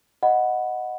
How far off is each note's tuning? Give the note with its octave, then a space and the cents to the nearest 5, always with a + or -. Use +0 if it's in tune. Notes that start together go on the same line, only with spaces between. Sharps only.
D#5 +0 F#5 +0 B5 +0